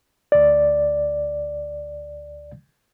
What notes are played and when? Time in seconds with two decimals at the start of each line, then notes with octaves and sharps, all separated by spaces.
0.32 D2 D5